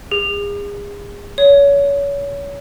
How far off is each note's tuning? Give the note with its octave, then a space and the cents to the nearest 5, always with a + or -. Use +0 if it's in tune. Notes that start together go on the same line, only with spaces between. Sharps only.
G#4 -35
C#5 +30